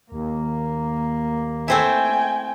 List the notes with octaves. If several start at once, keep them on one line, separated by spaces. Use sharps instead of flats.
D#2 A#3
A3 C4 E4 G5 G#5